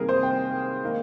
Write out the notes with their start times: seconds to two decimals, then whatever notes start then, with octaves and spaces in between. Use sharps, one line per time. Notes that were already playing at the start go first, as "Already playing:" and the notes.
Already playing: C3 D#3 G3 A#3 G#4 A#4
0.09 C5
0.23 G5
0.84 D#3 A#3